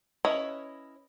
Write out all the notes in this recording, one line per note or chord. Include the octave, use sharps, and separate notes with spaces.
C#4 E4 B4 C#5 D#5